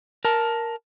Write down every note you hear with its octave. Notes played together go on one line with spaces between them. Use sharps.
A#4 A5